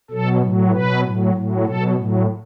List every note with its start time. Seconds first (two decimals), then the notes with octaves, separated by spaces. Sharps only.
0.10 B2 F#3 A4
0.41 A2 F#3
0.72 B2 F#3 B4
1.03 A2 F#3
1.34 A2 F#3
1.65 B2 F#3 A4
1.96 A2 F#3